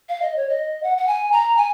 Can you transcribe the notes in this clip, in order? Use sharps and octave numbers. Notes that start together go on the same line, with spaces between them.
F5
D#5
C#5
D#5
F#5
F#5
G#5
A#5
G#5